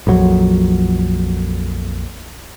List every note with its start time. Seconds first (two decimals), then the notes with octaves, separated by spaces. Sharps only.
0.07 A#1 F2 F#3